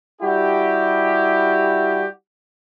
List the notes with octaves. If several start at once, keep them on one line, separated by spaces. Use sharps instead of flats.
G3 E4 F#4 G4